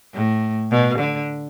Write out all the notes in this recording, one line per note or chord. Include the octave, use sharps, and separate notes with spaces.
A2
B2
D3